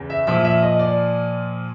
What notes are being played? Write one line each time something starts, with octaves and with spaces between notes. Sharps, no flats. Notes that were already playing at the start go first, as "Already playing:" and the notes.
Already playing: E2 C#3
E5
A#2 F3 E5
E5
D#5
D5